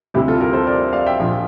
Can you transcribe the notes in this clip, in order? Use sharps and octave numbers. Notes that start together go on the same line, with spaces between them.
D2 C3 G3 E4 G4
F4 A4
G4 A#4
A4 C5
A#4 D5
D5 F5
E5 G5
A#1 A#2 F3